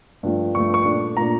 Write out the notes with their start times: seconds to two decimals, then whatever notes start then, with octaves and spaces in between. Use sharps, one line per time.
0.23 G2 F3 A3
0.55 G2 F3 A3 C#6
0.74 C#6
0.85 A#2 A3 D4
1.17 A#2 A3 D4 A#5